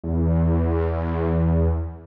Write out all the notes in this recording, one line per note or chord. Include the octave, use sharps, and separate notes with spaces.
E2